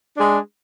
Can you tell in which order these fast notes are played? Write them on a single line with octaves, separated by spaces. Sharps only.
D4 G#4 G#3